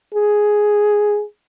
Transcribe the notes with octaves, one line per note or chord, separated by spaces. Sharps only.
G#4